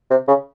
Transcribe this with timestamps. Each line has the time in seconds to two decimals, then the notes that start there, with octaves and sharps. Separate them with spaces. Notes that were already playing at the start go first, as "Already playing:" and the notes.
0.11 C3
0.28 C#3